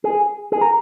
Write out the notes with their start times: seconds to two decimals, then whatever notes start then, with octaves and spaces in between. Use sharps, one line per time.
0.04 G#4
0.52 G#4
0.61 A#4